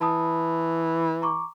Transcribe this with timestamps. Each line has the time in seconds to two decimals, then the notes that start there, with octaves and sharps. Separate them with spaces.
0.01 E3 A5 B5 D#6
1.22 A#5 C#6 D6